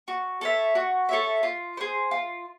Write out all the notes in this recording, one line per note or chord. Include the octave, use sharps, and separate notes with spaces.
F#4
A4 C#5 E5
F#4
A4 C#5 E5
F4
G#4 C5
F4